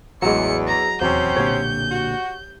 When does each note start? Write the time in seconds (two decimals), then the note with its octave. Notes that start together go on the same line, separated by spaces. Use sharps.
0.22 A1 E2 F#3 G#3 C#7
0.67 A#5
1.01 D#1 E2 C3 F#3 C4 C#4 G6
1.37 B1 A#2 D3 G4 C#5
1.91 F#4